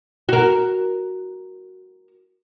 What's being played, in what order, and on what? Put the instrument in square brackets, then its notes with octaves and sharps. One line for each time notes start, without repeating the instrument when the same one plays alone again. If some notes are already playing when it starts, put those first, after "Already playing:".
[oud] F#4 A#4